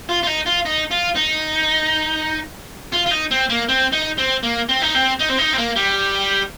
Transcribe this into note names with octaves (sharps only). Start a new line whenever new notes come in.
F4
F4
D#4
F4
D#4
F4
D#4
F4
F4
D#4
C4
A#3
C4
D#4
C4
A#3
C4
D#4
C4
D#4
C4
D#4
C4
A#3
G3